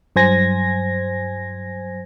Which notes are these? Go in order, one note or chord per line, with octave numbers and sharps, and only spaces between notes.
G2 F#3 C5 G#5 G#6 A#6